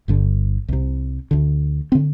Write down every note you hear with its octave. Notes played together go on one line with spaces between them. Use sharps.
G1 G2 D3
C2 C3
D2 D3
C4
D3